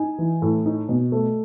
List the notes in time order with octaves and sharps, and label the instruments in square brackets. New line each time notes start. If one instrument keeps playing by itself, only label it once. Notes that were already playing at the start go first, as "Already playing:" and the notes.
Already playing: [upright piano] D#4 G#5
E3
A2
D#4
B2
A3